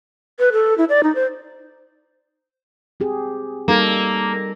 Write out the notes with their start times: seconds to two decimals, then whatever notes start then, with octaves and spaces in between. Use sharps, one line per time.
0.39 B4
0.52 A4
0.78 E4
0.89 D5
1.03 D#4
1.15 C5
3.00 C4 G4 G#4
3.68 G3 A#3 D#4 A4